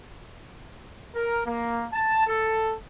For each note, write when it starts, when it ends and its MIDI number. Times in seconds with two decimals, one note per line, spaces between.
1.14 1.42 70
1.46 1.86 58
1.92 2.24 81
2.27 2.75 69